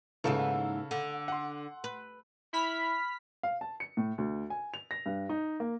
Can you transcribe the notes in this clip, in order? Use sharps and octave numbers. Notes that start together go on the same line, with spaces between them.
D#2 G#2 C#3 E3 A4 E7
D3
F#5 C6
B4
E4 B5 F6 B6
F5
A5
C#7
A2
D2
G#5
F7
A#6
G2
D#4
A#3